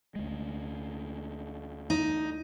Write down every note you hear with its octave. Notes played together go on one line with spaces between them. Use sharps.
D2 G#3
D#4